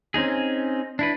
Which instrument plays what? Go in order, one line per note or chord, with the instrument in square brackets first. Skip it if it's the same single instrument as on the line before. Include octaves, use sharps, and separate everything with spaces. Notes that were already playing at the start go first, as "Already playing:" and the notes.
[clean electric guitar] C4 C#4 D#4 G#4
D4 E4 B4